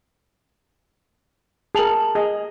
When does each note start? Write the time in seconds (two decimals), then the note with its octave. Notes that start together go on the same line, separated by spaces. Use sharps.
1.75 G#4 A#4 A5 F7 F#7
2.15 G#4 D#5